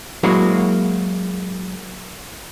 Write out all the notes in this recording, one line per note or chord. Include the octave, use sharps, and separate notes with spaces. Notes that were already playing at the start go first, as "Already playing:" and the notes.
F#3 G#3 A#3 E4 F#4 C#5